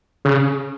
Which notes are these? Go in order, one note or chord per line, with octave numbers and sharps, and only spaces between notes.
C#3